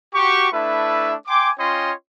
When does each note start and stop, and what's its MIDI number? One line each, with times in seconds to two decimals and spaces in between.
0.14 0.48 66
0.14 0.48 67
0.14 0.48 85
0.53 1.14 57
0.53 1.14 62
0.53 1.14 64
0.53 1.14 71
0.53 1.14 76
1.27 1.50 79
1.27 1.50 80
1.27 1.50 84
1.27 1.50 86
1.58 1.92 61
1.58 1.92 65
1.58 1.92 73
1.58 1.92 75
1.58 1.92 79
1.58 1.92 84